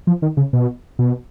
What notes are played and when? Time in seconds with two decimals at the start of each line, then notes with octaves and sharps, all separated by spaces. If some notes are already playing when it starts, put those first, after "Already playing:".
0.07 F3
0.22 D#3
0.37 C#3
0.53 B2
0.99 B2